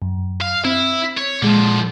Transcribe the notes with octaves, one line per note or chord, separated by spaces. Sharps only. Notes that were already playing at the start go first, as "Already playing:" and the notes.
F#2
F5
C4 E4
C#5
A#2 D3 F3 G#3